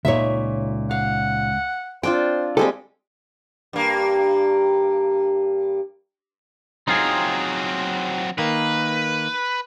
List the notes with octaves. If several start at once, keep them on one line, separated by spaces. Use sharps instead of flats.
C#2 A#2 D#4 C#5 E5
F5 F#5
C4 D4 F4 C5 G5
G3 G#3 C4 A4 C5
G2 A#3
F#3 C4 D#4 F4 G#4
D#3 A#3 B4